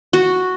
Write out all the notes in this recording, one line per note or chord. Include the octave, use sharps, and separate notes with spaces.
F#4